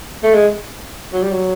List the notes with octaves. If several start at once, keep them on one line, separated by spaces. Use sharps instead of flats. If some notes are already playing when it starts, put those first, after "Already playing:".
A3
G#3
F#3
G3
F#3